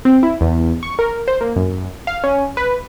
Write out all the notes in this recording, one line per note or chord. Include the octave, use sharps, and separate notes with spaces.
C4
E4
E2
C#6
A#4
C5
A#3
F#2
F5
C#4
B4